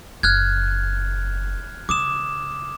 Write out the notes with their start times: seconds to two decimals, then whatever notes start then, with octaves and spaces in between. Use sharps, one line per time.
0.23 F#1 F6 F#6 G#6
1.89 C#3 D6 D#6 E7